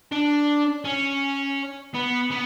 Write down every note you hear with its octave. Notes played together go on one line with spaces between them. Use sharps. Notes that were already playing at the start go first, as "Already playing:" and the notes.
D4
C#4
B3
B3